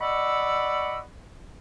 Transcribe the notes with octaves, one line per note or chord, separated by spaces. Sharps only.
D5 D#5 F#5 B5 C#6 E6